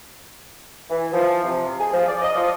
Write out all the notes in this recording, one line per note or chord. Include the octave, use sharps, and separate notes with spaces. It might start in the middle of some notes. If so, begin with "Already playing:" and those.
E3
F3
C3
G#4
F3
D5
D#5
F3